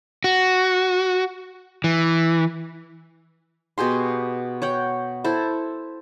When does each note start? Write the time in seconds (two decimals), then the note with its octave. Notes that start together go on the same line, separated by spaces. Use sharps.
0.24 F#4
1.84 E3
3.78 B2 G4 G#4 C6
4.62 C#5 F#5 G5
5.24 E4 A4 C5